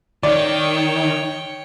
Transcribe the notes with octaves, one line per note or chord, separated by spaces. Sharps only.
D#3 C#5 D5 G5